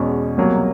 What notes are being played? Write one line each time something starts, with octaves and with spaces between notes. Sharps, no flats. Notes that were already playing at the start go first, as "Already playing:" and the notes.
Already playing: E2 B2 G#3 C#4
C2 B2 F#3 A#3